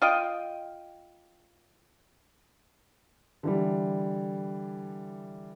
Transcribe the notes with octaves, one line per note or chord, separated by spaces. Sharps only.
F4 D#5 G5
D3 E3 G3